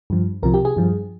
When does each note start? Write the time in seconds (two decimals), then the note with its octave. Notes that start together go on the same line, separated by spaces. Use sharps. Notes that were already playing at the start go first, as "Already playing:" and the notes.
0.10 G2 F3
0.43 C2 C3 F3 A#4
0.54 G4
0.65 G#4
0.76 G2 F3